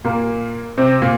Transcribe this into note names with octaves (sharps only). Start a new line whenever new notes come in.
A#2 A#3
C3 C4
A#2